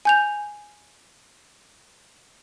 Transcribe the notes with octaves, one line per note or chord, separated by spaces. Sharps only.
G#5 G6 F7